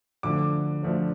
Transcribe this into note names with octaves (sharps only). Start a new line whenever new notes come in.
D2 D3 F3 A3 D4 D6
D2 D3 F3 A3 D4